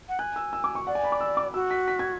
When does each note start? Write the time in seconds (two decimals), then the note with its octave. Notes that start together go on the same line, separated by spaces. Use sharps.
0.09 F#5
0.19 G#5 F#6
0.36 E6
0.53 E6
0.64 D6
0.75 C#6
0.87 D5 F#5
0.95 G#5
1.04 B5
1.12 D6
1.21 E6
1.37 D6
1.54 F#4 E6
1.71 B6
1.88 B6
1.99 G#6